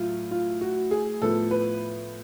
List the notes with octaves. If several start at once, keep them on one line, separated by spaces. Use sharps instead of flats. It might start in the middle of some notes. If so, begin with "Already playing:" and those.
Already playing: A2 F#3 A3 F4
F4
F#4
G#4
A2 F3 B3 A4
B4